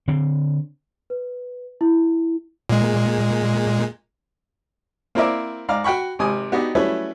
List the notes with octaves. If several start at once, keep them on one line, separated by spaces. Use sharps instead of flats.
D3 C4
B4
E4
A#2 G#3
A#3 C4 E4 A#4 D5 E5
G#2 D5 F5 A#5 F6
F#4 F#5 G5 B5 C#6
G#1 C3 G#5 D#6
B3 D4 D#4 F#4 G4
F#3 G3 A3 C#4 E4 B4